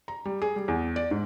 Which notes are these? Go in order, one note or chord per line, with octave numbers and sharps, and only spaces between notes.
A#5
G3
G#4
G3
E2
D5
G#2